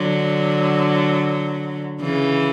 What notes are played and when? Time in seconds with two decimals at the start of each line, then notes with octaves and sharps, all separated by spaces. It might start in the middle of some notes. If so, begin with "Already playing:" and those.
Already playing: D3 F#3
2.01 C#3 E3